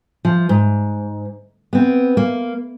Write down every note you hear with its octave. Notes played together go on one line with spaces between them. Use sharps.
F3
G#2
B3 C4
A#3